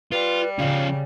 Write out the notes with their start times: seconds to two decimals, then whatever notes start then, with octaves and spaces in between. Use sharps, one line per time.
0.11 G3 F4 B4
0.59 C#3 F3 C#4 F5